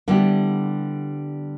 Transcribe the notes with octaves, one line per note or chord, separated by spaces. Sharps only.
D3 G3 B3 E4 G4